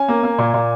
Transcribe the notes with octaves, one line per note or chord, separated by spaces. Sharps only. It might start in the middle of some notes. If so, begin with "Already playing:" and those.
Already playing: C#4 G#5
A#3
A#3
A#2
A#2